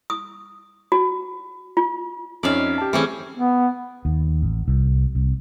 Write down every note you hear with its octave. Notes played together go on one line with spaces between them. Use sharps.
D#6
F#4
F4
F2 C#4 D#4 D5 E5 F5
G4 A5
E3 G3 A3 C4 C#4 G#4
B3
D#2
A1
C2
C2